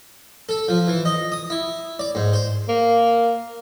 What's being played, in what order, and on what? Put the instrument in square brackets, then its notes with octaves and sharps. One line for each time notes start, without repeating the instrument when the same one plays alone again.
[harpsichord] A4
F3
E3
D#5
D#6
E4
D5
G#2
C5
[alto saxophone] A#3